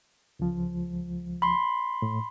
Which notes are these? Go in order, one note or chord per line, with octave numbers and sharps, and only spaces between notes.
C#2 F3
B5 C6
A2